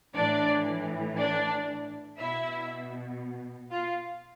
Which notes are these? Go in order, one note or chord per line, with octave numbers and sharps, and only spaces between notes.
A2 E3 D4 D5
D4 D5
B2 E4 E5
F4 F5